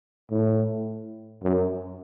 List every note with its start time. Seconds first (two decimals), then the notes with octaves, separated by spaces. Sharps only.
0.31 A2
1.44 F#2